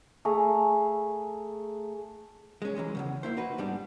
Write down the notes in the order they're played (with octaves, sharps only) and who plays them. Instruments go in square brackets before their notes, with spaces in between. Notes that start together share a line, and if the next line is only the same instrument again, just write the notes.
[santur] A3 G#4 A#5
[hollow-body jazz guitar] G#3 C#4
E3 F#3 G#3 C#4
E2 G#2 C#3
A#3 E4 C5
D#4 F#4 B4
G#2 G3 B3 D4